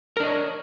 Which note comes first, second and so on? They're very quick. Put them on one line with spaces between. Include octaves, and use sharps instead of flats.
A#4 D4 D#5 C#5